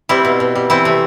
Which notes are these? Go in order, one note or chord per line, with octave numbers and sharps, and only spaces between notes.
G3 C4 E4
B2
B2
G3
E3 C4 E4
C3 A3